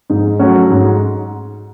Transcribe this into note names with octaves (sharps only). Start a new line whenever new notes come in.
G#2 D#4
F#3 A3 C#4 F#4
G#2